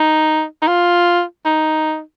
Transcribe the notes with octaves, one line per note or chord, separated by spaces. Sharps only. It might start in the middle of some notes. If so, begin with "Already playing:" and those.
Already playing: D#4
D#4
F4
D#4